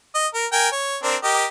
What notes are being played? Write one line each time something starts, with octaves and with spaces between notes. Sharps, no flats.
D#5
A#4
A#4 G5 G#5
C#5
C4 D4 A#4
G4 A#4 D#5